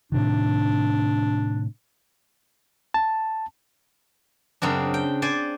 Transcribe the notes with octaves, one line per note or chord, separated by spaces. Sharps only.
A2 C3 D#3 D4
A5
F#2 C#3 C4 D4
G5
C5 D5 G#5